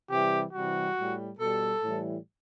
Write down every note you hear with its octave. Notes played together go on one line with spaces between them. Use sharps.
C3 E3 G3 G4
C3 E3 G3 F#4
A2 G3
B2 G3 A4
A2 E3 G3